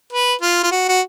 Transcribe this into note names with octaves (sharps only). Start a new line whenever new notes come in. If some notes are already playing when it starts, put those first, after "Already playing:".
B4
F4
F4
F#4
F#4